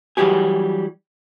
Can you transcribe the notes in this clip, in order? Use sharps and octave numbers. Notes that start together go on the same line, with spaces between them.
E3 F#3 G3 G4 G#4